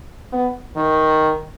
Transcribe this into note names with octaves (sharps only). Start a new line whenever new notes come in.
B3
D#3